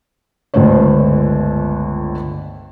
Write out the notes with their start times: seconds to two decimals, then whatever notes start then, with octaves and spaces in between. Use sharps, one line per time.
0.54 G1 C#2 D3 A3 C5 C#5